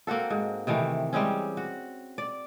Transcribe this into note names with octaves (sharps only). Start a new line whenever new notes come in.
A#3 C4 F#4 A4
G#2
C3 D#3 E3 A3
G3 G#3 C4 C#4
F#4
D5